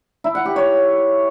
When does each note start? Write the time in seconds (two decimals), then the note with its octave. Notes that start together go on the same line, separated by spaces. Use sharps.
0.24 E4
0.35 F#5
0.45 G4
0.56 C#5